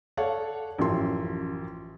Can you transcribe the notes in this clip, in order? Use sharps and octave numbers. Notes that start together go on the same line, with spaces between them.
A4 C#5 D5 F5 F#5
A1 F#2 F3 C6